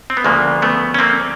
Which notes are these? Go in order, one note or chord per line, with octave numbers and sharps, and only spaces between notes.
C4
B3
D2 C#3 F3 G#3 A#3
A3 B3
C#4
A#3 C4